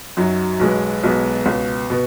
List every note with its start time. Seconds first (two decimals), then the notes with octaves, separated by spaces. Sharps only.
0.17 F#2 F#3 D#4 F#4
0.60 B1 B2 G#3 B3
1.03 B1 B2 G#3 B3
1.46 C#2 B2 B3
1.90 B2 B3